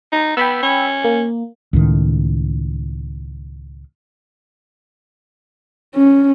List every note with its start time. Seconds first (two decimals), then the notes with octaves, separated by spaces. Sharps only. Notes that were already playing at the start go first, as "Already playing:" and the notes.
0.12 D#4
0.37 B3 G5 B5 E6
0.62 C#4
1.04 A#3
1.73 C#2 A2 D#3
5.95 C#4